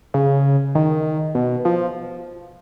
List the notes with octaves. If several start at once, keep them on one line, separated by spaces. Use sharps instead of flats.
C#3
D#3
B2
F3